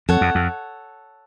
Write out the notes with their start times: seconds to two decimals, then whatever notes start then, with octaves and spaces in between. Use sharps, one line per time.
0.09 F2 A4 C#5 F#5
0.21 F2
0.35 F2